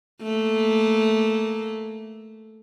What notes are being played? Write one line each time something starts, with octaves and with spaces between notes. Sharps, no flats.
A3 A#3